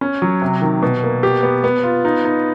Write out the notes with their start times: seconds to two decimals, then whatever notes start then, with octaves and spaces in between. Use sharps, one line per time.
0.01 C#4
0.22 F#3
0.42 C3
0.62 D#3
0.82 B2
1.03 A#3
1.23 G4
1.43 B3
1.64 B3
1.83 F4
2.05 D#4
2.25 D#4